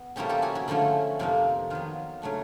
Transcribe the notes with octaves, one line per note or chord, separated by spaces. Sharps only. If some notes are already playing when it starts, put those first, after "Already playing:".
Already playing: B3
C#3 F3 A#3 C#4 E4 G4 A4
G4 A4
F#4 G#4
E4 F#4
D3 F3 A3 C#4 E4
F2 C3 F3 A#3 D#4
D#3 F#3 B3 F4
C#3 F#3 A3 D4